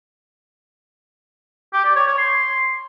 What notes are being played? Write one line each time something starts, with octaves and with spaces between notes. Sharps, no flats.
G4
D5
C#5
C#5
C6